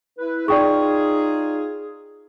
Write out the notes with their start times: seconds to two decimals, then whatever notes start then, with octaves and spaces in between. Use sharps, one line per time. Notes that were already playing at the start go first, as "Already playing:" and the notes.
0.18 E4 B4
0.48 D#4 F4 G#4 D5 G5 C#6